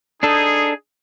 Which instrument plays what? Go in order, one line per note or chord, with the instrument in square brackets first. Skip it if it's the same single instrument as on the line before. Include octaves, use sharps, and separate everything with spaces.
[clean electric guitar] D4 A4 [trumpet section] D#4 G#4